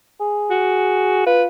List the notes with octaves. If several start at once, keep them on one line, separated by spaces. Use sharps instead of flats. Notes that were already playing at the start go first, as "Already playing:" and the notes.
G#4
F#4
F4 B4